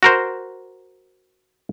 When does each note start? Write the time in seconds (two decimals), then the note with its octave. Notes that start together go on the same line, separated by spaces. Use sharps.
0.03 F#4 A#4 C5